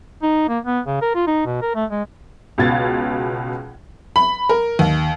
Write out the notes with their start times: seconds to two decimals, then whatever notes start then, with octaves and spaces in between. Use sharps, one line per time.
0.23 D#4
0.48 A#3
0.65 B3
0.87 C#3
1.01 A#4
1.15 F4
1.27 D#4
1.46 B2
1.62 A#4
1.75 A3
1.90 G#3
2.58 C#2 B2 F5 G#6 A6
4.16 B5
4.49 A#4
4.79 D#2